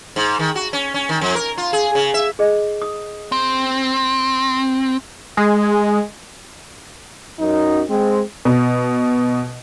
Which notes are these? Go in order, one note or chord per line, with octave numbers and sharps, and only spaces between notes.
G#2
D#3
F#4
C#4
C#4
D#3
F2
A#4
F4
G#4
C#3
E5
G#4 D#5
D#6
C4
G#3
F#2 D#4
G#3 C4
B2